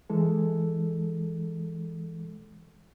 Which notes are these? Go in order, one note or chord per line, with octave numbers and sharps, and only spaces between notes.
E3 G#3 A4